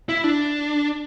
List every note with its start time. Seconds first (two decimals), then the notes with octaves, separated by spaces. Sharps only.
0.09 E4
0.24 D4